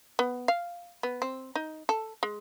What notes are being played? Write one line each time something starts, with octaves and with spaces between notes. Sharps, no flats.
B3
F5
B3
C4
D#4
A4
G#3